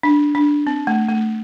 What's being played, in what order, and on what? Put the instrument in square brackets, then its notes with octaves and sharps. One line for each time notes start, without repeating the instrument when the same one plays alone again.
[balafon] D4
D4
C4
A3
A3